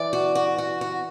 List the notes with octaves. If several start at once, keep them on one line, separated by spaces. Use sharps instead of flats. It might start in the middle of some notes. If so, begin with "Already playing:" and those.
Already playing: E3 E4 D5
F#4
F#4
F#4
F#4